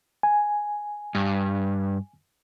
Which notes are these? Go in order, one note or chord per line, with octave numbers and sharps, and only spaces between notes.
G#5
G2